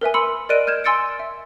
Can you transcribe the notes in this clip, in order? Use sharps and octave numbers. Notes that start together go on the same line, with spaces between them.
A#4 B4 E5 G#5
B5 C6 E6 C#7
A#4 D5 D#5 F#6 D7 D#7
F6 G6 G#6 E7
G#5 C6 E6 A6 C#7 D7
E5